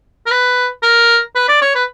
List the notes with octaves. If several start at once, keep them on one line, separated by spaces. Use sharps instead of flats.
A#4
B4
A#4
B4
D5
C#5
B4